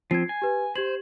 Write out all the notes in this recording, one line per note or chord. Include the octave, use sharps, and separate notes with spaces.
F3 C4 G#6 C7
G#5
G4 B4
G4 C5 G#6 F#7